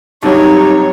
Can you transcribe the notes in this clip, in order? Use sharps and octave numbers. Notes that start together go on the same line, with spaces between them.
G2 C3 F#3 D#4 C#5